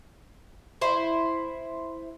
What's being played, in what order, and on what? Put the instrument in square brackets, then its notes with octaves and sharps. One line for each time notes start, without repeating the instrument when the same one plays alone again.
[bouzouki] E4 C5